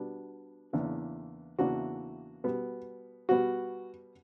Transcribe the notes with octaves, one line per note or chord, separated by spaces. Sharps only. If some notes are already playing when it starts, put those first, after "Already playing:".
Already playing: B2 G3 B3 D4
E2 C#3 E3 A#3 D4
E2 C#3 E3 A#3 D4 F#4
B2 G3 B3
B2 G3 B3 F#4